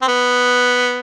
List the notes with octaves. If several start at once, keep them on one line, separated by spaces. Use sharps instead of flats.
C4
B3